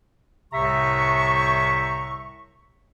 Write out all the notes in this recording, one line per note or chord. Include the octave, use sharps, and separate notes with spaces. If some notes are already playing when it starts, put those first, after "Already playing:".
C2 A2 C3 E5 A#5 C#6